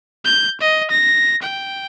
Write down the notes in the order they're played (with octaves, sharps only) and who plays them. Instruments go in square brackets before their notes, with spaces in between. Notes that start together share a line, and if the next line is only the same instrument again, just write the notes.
[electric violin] G6
D#5
A#6
G5